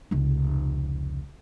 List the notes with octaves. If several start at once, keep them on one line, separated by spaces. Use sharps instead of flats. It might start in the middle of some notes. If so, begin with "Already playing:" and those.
F1 C#2